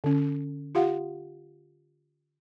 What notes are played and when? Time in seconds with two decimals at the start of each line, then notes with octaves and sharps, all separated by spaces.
0.04 D3 C#4
0.75 F4 G4 F5 F#5